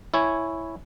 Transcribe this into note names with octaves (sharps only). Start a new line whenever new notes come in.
E4 C#5 G#5